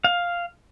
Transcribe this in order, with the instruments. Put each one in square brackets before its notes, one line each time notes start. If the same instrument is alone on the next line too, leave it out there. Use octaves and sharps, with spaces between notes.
[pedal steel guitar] F5